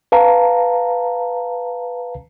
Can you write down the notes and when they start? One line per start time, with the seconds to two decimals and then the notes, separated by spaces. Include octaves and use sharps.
0.12 B4 F5 A5 A#5